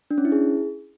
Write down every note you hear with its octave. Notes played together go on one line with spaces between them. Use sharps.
D4
C#4
E4
G#4